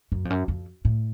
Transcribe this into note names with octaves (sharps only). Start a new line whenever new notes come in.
F#2
F2
F#2
F2
A2